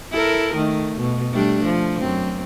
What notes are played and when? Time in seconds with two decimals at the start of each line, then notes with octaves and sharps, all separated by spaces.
0.12 E4 A4 A#4
0.55 D#3 A3
0.98 B2
1.32 G3 A3 D4
1.64 F3
1.99 F#2 C4